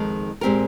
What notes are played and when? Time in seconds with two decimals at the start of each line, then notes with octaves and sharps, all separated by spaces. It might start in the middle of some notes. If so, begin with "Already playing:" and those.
Already playing: F2 D#3 G#3
0.41 A#2 G#3 C4 G4 A#4